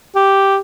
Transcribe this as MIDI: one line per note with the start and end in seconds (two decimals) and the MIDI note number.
0.15 0.58 67